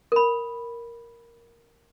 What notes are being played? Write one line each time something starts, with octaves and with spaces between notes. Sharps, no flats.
A#4 B5